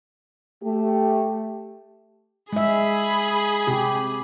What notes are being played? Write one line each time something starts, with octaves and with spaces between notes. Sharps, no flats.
A3 G4
G#3 G#4 E5 B5
C3 G4